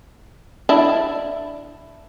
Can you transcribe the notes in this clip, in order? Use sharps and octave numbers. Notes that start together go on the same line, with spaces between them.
D4 E4